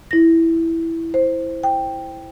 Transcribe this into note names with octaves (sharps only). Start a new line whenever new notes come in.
E4 A#6
C5
G5